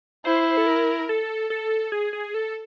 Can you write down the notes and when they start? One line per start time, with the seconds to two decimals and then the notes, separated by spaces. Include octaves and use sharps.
0.25 E4 C5
0.57 A4
0.67 A#4
1.09 A4
1.50 A4
1.92 G#4
2.13 G#4
2.34 A4